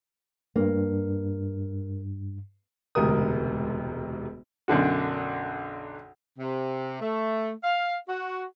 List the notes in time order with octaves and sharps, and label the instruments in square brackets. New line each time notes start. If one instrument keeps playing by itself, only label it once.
[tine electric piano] G2 [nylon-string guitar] A#3
[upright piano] E1 D2 G#2 C3 A#4 D#6
[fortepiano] B1 F#2 D3 F#4
[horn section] C3
A3
F5
F#4